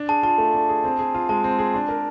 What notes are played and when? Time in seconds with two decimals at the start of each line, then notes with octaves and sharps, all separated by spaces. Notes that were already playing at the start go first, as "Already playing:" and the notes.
Already playing: D4
0.09 G#4 A5
0.23 F4 A5
0.38 A3
0.54 D4
0.69 G#4
0.84 C4
0.99 G#4
1.14 F4
1.29 G#3 A5
1.44 C4
1.59 G#4
1.74 D4
1.89 A#4